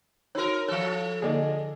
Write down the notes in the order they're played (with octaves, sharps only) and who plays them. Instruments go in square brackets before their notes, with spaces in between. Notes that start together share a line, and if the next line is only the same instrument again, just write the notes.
[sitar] D#4 A#4 [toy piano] F#4 C#5
[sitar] F3 A4 [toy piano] C#5 F5
[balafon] D3 A#3 D#4 [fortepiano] G#4 D5 D#5